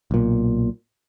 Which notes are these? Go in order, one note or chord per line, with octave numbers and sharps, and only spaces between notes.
B1 A#2